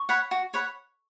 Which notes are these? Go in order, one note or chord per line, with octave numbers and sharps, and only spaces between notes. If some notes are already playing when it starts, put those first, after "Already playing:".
Already playing: C#6
C#5 F#5 B5
F#4
C#5 F#5 B5